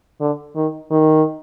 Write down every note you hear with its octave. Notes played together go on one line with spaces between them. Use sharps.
D3
D#3
D#3